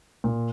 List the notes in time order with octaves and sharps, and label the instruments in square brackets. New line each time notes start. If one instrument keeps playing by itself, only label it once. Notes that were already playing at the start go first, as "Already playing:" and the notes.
[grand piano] A#2